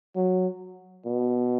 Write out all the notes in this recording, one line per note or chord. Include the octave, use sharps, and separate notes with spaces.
F#3
B2